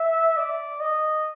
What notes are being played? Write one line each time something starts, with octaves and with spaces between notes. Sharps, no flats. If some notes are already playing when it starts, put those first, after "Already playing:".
Already playing: E5
D5
D#5